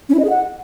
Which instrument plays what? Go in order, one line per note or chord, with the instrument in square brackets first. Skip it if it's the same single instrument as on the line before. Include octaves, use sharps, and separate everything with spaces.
[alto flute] C#4
E4
D#5
G#4
F#5